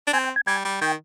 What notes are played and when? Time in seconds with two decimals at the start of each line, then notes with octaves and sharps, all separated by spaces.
0.07 D4
0.13 C4 G#5
0.24 G5
0.36 G#5
0.47 G3 G#5
0.65 G3
0.82 D#3 G5